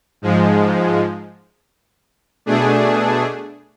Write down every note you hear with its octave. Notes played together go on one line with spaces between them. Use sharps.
G#2 F3 G#3
B2 A3 D4 G#4